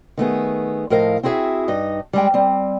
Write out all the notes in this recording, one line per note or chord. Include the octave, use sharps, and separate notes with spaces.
D#3 A3 B3 G#4
A2 F3 A#4 D#5 F5
C4 E4 F#4 G#4 E5
G2 D#4 D#5
G3 G#3 G5
G3 C4